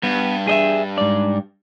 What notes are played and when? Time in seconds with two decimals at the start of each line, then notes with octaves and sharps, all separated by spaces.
0.03 G2 B3
0.47 G#4 D#5 E5
0.98 G#2 D5